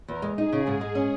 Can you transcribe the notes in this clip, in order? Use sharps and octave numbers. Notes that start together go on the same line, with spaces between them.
E2 A#4
G#3
D#4 G#4
C#3
G#2
G#3
C#4